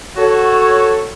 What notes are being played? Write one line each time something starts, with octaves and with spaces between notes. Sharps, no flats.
F#4 A4 C#5